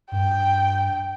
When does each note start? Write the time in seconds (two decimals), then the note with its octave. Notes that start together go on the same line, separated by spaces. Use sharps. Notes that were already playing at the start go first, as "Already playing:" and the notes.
0.12 G2 G5